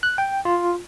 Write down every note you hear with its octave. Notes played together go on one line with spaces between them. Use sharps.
F#6
G5
F4